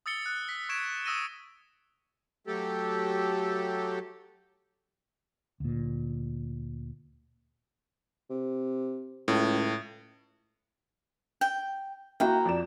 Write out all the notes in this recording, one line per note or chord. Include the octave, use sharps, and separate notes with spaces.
D#6 E6 A6 C#7 G7
F#6
B6
C#6 G#6 B6 D7 E7
D#6 E6 A#6 D#7 G7
F#3 A3 G4 A4
D2 A#2
C3
C#2 A2
G5
A#3 E4 F#4 G5 A#5
F2 D5 E7